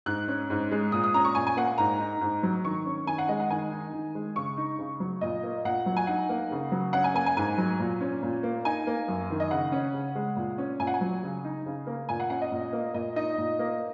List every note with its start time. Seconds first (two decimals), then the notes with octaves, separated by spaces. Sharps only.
0.06 G#2 F#6
0.28 C#4
0.50 G#2
0.71 G#3
0.92 A#2 D#6
1.04 D#6
1.14 C#4 A#5
1.25 C#6
1.35 A#2 G#5
1.47 G#5
1.57 A#3 F#5
1.78 G#2 A#5
2.00 D#4
2.21 G#2
2.43 F#3
2.65 D#3 C#6
2.85 C#4
3.07 D#3 G#5
3.18 F#5
3.29 G#3 D#5
3.40 F#5
3.50 D#3 G#5
3.71 D#4
3.93 D#3
4.15 G#3
4.36 C#3 C#6
4.57 D#4
4.78 C#3
5.00 F#3
5.21 A#2 D#5
5.43 A#3
5.65 A#2 F#5
5.86 F#3
5.97 G#5
6.07 D#4 F#5
6.29 A#3
6.51 C#3
6.72 F#3
6.93 C#4 F#5
7.04 G#5
7.14 A#3 G#5
7.26 G#5
7.37 G#2 G#5
7.58 F#3
7.79 A#2
8.01 C#4
8.23 A#2
8.43 A#3
8.65 D#4 G#5
8.87 A#3
9.08 F#2
9.30 D#3
9.40 D#5
9.51 C#3 F#5
9.72 C#4
9.94 C#3
10.15 G#3
10.36 A#2
10.58 C#4
10.80 A#2 G#5
10.87 F#5
10.94 G#5
11.01 F#3
11.23 C#3
11.44 D#4
11.66 C#3
11.87 A#3
12.09 A#2 G#5
12.20 F#5
12.30 C#4 F#5
12.42 D#5
12.52 A#2
12.73 A#3
12.94 A#2 D#5
13.16 D#4 D#5
13.38 A#2
13.59 A#3